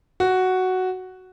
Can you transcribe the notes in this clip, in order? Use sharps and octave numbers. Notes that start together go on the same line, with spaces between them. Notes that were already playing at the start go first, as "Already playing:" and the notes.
F#4